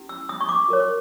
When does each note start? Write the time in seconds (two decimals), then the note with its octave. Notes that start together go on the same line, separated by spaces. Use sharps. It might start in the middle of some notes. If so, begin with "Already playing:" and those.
Already playing: C#4 E4 G4
0.09 E6
0.29 D#6
0.41 C#6
0.49 D6
0.69 F#4 A#4 C#5